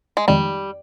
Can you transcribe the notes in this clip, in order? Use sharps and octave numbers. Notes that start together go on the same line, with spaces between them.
G#3
F2 D#3 G3 G#3 D#4